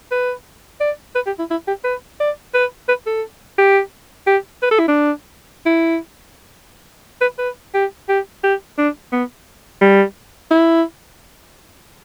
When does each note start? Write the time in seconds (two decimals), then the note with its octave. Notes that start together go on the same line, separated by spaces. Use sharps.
0.11 B4
0.80 D5
1.15 B4
1.26 G4
1.39 E4
1.51 E4
1.68 G4
1.84 B4
2.20 D5
2.54 B4
2.88 B4
3.06 A4
3.59 G4
4.27 G4
4.62 B4
4.71 A4
4.79 E4
4.88 D4
5.66 E4
7.21 B4
7.39 B4
7.74 G4
8.09 G4
8.44 G4
8.78 D4
9.13 B3
9.81 G3
10.51 E4